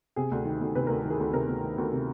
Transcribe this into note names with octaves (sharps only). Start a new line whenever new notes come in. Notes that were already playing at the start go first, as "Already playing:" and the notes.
C3 G#4
D2
D#3
D2
C3 B4
D2 A#4
A4
D#3
G#4 A#4
D2
C3 G#4 A#4
D2
D#3
D2
C3